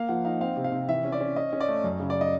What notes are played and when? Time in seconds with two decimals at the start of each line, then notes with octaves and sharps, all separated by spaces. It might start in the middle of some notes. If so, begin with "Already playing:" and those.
Already playing: A#3 F5
0.09 F3 F#5
0.25 D#4 F5
0.41 C4 F5
0.57 C3
0.64 F5
0.72 C3
0.88 E3 E5
1.04 C#4
1.12 D5
1.20 C#4
1.36 C#4 D#5
1.53 C#4
1.61 D5
1.68 A3
1.84 F#2
2.00 C#3
2.10 D5
2.21 D#5